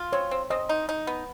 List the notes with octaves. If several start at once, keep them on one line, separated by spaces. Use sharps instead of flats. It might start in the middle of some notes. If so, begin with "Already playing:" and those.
Already playing: F4
C4 C#5
C4
C4 D#5
D#4
D#4
B3